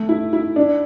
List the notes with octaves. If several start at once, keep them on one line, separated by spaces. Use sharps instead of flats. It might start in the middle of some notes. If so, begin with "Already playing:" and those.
Already playing: A3
E4
E4
D4